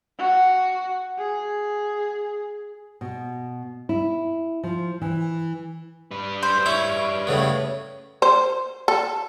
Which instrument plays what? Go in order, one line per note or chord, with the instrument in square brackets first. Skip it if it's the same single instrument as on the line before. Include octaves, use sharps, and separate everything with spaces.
[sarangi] F#4
G#4
[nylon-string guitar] B2
E4
F3
E3
[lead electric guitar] G3 B4
[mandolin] C5
[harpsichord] E4 [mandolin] C#5
[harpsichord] A2 C#3 B3
[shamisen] C5
A4